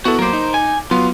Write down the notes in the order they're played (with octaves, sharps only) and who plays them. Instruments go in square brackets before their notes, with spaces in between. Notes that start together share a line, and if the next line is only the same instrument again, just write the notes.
[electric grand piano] B3 E4 A4 [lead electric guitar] F#4
[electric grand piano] F#3 A#3 D6 [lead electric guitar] A#4 C5
[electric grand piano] D#4
[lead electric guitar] G#5
[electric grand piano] F#3 B3 [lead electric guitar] F4